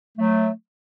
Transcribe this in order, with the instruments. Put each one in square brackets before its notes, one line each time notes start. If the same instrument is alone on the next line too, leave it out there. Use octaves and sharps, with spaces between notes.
[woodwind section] F#3 A3